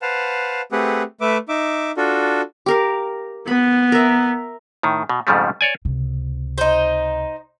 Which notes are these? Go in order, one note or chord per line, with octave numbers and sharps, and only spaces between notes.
B4 C5 F5 F#5 A5
A3 C4 G4 G#4 B4 F#5
A3 B4 E5 D6
D#4 E5 D6
D4 F4 F#4 A4
G4 A#4 F5
B3 B5
A#4 E5
A2 D#3
B2
F2 G#2 C#3 F3 G3 A3
C#5 D5 G#5
C#2 C3
D#4 C5